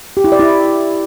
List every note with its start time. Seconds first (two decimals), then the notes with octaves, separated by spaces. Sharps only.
0.17 G4
0.24 E4
0.32 D5
0.40 E4